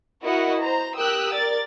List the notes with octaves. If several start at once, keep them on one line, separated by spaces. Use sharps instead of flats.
E4 F#4 A#4 D#5 F#5
C5 A#5
G4 A#4 G5 D#6 E6 F#6
A#4 D5 A6